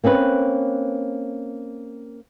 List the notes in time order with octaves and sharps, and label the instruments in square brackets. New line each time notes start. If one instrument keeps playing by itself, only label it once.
[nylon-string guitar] A#3 C4 C#4 B4